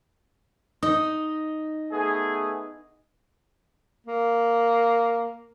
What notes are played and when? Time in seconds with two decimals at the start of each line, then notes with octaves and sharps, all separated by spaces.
0.83 D#4 D#5
1.92 A3 B3 G#4
4.07 A#3